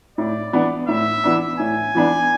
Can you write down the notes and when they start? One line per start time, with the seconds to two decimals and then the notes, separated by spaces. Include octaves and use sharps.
0.18 A2 D5
0.53 E3 B3 D4
0.88 A2 E5
1.24 E3 B3 D4
1.59 A2 G#5
1.95 E3 B3 D4